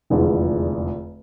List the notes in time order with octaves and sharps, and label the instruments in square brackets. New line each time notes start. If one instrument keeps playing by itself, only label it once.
[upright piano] F1 E2 D3 F3 G#3